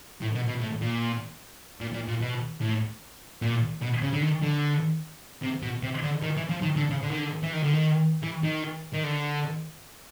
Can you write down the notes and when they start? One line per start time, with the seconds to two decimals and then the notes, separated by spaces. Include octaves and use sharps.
0.21 A2
0.35 B2
0.48 B2
0.61 A2
0.81 A#2
1.81 A#2
1.94 A#2
2.08 A#2
2.21 B2
2.61 A2
3.42 A#2
3.82 B2
4.02 C#3
4.13 D3
4.23 D#3
4.42 D3
5.43 C3
5.63 B2
5.83 C3
6.03 D3
6.23 D#3
6.37 E3
6.49 F3
6.62 D#3
6.76 D3
6.90 C#3
7.03 D3
7.10 D#3
7.18 D3
7.43 E3
7.53 D#3
7.63 D3
7.73 D#3
8.23 E3
8.43 D#3
8.94 D#3
9.04 D3